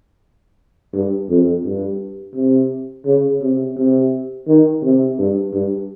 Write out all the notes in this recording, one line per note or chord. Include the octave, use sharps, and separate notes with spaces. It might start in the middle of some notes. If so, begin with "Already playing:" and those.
G2
F2
G2
C3
C#3
C3
C3
D#3
C3
G2
G2